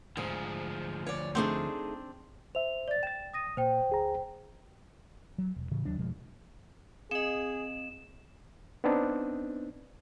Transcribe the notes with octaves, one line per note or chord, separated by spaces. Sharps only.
D2 G#2 F3 G#4
C#5 D5
A3 C4 D4 D#4 G#4
C5 E5 F7
D5 A6
G5 A6 E7
D#6 A#6 D#7
A#2 C5 G5
D2 G#4 A#5
F#3
E1
A2 C#3 E3
D#2 F#3 D4
F1 B2 F3 G#3
C4 G#4 D#5 E7
B3 C4 D4 D#4